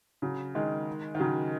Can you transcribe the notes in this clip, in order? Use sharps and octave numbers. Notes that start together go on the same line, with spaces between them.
C#3 F#3
D#3 G#3
D#3
C#3 F#3